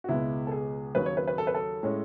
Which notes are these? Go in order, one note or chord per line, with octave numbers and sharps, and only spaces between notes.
F#4
C#2 B2 G#3 B3 E4
A4
G#4
D#2 C#3 F#3 B4
C#5
B4
B4
A4
B4
A4
A2 G#3 C#4